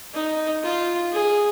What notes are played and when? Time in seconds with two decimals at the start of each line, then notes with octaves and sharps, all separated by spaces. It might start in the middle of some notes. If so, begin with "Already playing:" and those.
0.14 D#4
0.62 F4
1.12 G#4